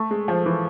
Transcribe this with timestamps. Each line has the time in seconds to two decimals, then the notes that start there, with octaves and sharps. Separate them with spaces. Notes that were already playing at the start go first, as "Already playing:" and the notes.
Already playing: A3
0.11 G#3
0.28 F3
0.46 E3